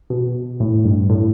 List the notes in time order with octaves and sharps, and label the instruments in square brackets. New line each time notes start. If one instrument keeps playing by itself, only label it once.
[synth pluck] B2
A2
G2
A2